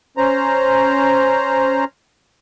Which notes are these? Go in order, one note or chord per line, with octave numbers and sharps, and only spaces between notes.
C#4 C5 A#5